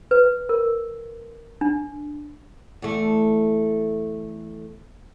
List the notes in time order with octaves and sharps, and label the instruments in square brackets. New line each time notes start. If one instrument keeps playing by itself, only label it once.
[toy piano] B4
A#4
D4
[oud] E2 A3